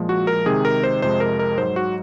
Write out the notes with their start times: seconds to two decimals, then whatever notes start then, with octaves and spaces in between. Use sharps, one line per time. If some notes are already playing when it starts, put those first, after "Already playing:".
Already playing: A#2 F3 G#3
0.09 F#4
0.27 A#4
0.46 C3 D#3 G#3 G#4
0.65 A#4
0.84 C5
1.02 F2 C3 F3 G#3 C5
1.20 A#4
1.39 A#4
1.58 G#2 F#3 C5
1.76 F#4